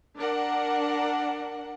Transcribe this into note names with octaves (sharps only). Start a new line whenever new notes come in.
D4 A#4 F#5